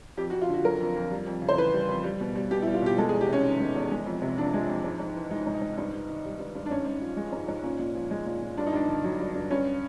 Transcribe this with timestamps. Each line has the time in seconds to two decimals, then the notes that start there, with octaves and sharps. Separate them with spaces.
0.17 F2 G4
0.30 F#4
0.33 F2
0.42 F4
0.49 D3 F#4
0.65 F#3 A#4
0.80 F2
0.96 F2
1.11 G3
1.27 F2
1.42 C#3
1.49 C5
1.57 E3 B4
1.73 G3
1.89 F2
2.04 G3
2.21 B2
2.36 G3
2.50 B2 G4
2.62 E4
2.67 G3
2.74 F4
2.82 B2 G4
2.98 G#3 A4
3.09 G#4
3.13 E2
3.21 G4
3.28 C3 C#4
3.45 D#3
3.60 G#3
3.76 E2
3.91 G#3
4.06 F2
4.22 C3
4.38 F3 D4
4.54 G#3
4.69 F2
4.84 G#2
4.99 G#2
5.16 E3
5.31 G#3 D#4
5.46 G#2
5.54 D#4
5.61 G#2
5.77 G2 D#4
5.92 G2
6.08 D#3
6.25 G3
6.39 G2
6.55 G2
6.66 D4
6.70 G#2 C#4
6.86 G#2
7.01 F3
7.17 G#3
7.32 G#2
7.48 G#2
7.63 A#2 C#4
7.79 A#2
7.95 F3
8.11 G#3
8.26 A#2
8.42 A#2
8.57 G2 D4
8.67 D#4
8.72 G2 D4
8.88 D3
9.04 F#3
9.19 G2
9.34 G2
9.51 G2 C#4